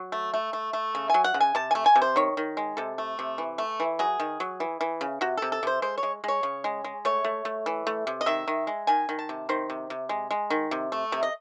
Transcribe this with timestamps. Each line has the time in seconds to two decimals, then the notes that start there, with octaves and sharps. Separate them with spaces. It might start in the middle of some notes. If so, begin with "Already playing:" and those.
Already playing: F#3
0.12 A3
0.34 A3
0.53 A3
0.73 A3
0.95 C#3
1.10 F#3 G#5
1.24 F#5
1.34 C#3
1.40 G#5
1.55 C3 A5
1.71 G#5
1.75 A3
1.86 G#5
1.96 C3
2.02 C5
2.16 D#3 C#5
2.37 D#3
2.57 G#3
2.77 C3 A4
2.98 A3
3.19 C3
3.38 E3
3.58 A3
3.80 E3
3.99 F#3 G#4
4.20 D#3
4.40 F#3
4.60 E3
4.81 E3
5.01 C#3
5.21 C3 F#4
5.37 C3 A4
5.52 A4
5.63 C3 C5
5.82 G#3 C5
5.98 C#5
6.03 G#3
6.24 G#3 C#5
6.43 C#3
6.64 G#3
6.84 G#3
7.05 A3 C#5
7.24 A3
7.45 A3
7.66 E3
7.87 A3
8.07 C3
8.21 D#5
8.26 D#3 E5
8.48 D#3
8.67 G#3
8.87 D#3 G#5
9.09 D#3
9.19 A5
9.29 C3
9.49 D#3 C5
9.70 C3
9.90 C3
10.09 G#3
10.31 G#3
10.50 D#3
10.71 C3
10.92 A3
11.12 C3
11.23 D#5